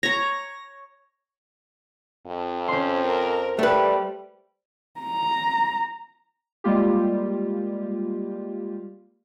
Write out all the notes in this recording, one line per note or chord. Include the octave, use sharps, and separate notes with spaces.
C#5 A#5 A#6
F2
C#4 C5 C6
A#4
G3 A3 B4
A#5
G3 G#3 A#3 F4 G4